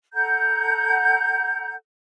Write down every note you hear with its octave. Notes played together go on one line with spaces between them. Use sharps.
A4 F#5 A#5 G6